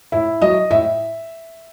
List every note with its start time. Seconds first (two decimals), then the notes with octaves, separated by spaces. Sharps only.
0.12 A2 E4
0.42 F#3 D#5
0.70 A2 E5